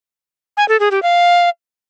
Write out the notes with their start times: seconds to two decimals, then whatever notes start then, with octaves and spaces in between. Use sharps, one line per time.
0.57 G#5
0.68 A4
0.80 G#4
0.91 G4
1.03 F5